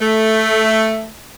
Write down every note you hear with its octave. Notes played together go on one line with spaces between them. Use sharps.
A3